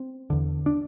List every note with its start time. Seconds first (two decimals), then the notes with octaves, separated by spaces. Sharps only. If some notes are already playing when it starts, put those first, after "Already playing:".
Already playing: C4
0.30 E2 D3
0.66 D4